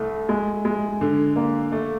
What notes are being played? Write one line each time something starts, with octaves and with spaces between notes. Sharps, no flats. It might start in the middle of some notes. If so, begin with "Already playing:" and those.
Already playing: C2 A3
G#3
G#3
D3
A#3
A3